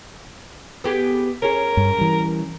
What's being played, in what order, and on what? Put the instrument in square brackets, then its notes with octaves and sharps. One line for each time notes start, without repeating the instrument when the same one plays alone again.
[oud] B3 G4 G#4
[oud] C#4 G#4 [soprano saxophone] A#4
[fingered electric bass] G2
E3 G3